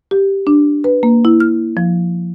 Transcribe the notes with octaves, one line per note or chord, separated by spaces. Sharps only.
G4
D4
B4
A#3
E4
F6
F3